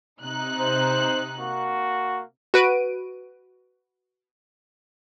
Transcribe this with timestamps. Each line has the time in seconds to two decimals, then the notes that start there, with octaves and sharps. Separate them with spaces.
0.20 C3 D#4 F#6
0.58 C5
1.38 A#3 F#4
2.54 F#4 B4 D7 D#7